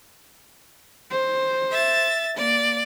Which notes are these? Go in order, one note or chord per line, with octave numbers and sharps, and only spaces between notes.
C5
E5 A6
A#3 D5